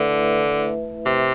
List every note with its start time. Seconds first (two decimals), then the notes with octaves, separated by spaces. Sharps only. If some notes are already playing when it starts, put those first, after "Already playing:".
Already playing: D3 A3 E4 B4 E5
1.06 C3